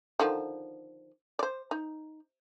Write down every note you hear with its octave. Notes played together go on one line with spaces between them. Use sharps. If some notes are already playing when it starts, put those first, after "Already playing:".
D3 D#3 F3
C5 D5
D#4